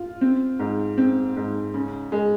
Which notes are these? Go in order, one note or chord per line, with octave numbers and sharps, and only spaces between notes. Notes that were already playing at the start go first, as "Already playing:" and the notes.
Already playing: F4
C4
G#2
C4
G#2
C#3
G#3